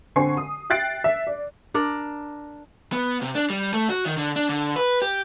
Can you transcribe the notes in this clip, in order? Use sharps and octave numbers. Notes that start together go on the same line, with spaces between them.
D3 C4 G#5 C#6 C7
D#6
E5 G5 F#6 A6 C7 D7
E5
D5
D4 A#4 D5
B3
C3
D4
G3
A3
F#4
D#3
D3
D4
D3
B4
G4